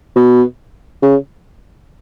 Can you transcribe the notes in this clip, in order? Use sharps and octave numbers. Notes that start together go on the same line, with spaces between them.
B2
C#3